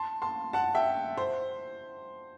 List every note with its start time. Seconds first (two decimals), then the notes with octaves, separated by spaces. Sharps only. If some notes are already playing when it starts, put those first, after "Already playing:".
Already playing: A5 C6
0.22 A5 C6
0.53 F#5 A5
0.75 E5 G5
1.17 C5